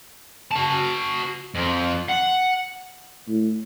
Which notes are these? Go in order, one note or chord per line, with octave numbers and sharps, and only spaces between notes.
F#4 A5
F2
F#5
A2